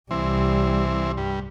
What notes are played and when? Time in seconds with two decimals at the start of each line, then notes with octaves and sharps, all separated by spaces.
0.11 C2 E3 G3 C4
1.18 G2